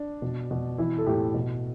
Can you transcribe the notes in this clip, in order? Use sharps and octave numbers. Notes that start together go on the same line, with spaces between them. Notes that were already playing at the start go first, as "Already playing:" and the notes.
Already playing: D4
B2
B2
E3 E4
A4
A2 G4
B2